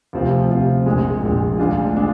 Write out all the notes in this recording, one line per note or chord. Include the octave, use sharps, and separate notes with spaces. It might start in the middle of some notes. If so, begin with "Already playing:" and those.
D2 C3 F3 C4 F4
D2 C3 F3 C4 F4
A#1 A#2 G#3
A#1 A#2 G#3
D2 D3 G#3 D4 F4
D3 G#3 D4 F4